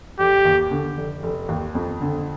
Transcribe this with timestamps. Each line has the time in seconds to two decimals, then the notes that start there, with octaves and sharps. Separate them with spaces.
0.19 F1 G4
0.45 D#2
0.71 D3
0.97 F1
1.23 F1
1.49 D#2
1.75 F2
2.01 D3